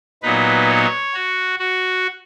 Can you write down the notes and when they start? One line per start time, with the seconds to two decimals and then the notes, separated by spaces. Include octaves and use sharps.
0.23 A#2 F#3 B3 D#4 B4
0.68 C#5
1.14 F#4
1.59 F#4